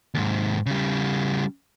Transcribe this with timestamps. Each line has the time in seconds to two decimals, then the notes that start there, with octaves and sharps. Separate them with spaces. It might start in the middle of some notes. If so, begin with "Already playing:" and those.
0.14 D#2 G#2
0.66 C#3 G3